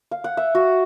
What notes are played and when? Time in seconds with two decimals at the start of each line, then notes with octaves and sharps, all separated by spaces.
0.11 F5
0.24 F#5
0.37 E5
0.55 F#4